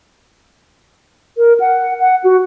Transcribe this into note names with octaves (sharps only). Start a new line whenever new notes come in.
A#4
F#5
F#5
F#4